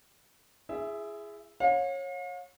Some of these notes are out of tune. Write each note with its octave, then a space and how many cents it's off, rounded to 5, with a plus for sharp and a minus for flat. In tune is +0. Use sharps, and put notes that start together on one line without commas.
E4 +40 G#4 +0 E5 +0
C#5 -20 F5 +40